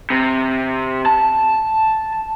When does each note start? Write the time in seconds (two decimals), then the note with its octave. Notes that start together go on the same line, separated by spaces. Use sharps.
0.10 C3
1.06 A5